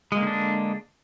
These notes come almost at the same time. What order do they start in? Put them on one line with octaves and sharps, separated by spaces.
G#3 A#3 D3 D4